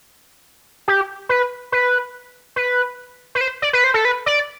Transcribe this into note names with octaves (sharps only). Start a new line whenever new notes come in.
G4
B4
B4
B4
B4
C5
D5
B4
C5
A4
B4
D5